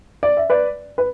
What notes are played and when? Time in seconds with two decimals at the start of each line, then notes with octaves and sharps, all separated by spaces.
0.23 D5
0.37 E5
0.50 B4 D5
0.98 B4